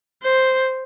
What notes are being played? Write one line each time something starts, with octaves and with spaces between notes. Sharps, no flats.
C5